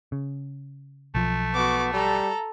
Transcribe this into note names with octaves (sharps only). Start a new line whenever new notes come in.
C#3
B1 F3 A3
B3 F#4 D6
G3 A4 A#5